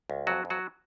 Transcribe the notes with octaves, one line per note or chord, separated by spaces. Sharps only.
C#2
F2 F#3 F#4
F2
F#3 F#4